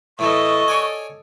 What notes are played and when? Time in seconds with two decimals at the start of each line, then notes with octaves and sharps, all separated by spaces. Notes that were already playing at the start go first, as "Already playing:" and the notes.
0.19 A2 E3 A3 A4 D#5 C#6
0.68 C#5 D5 G#5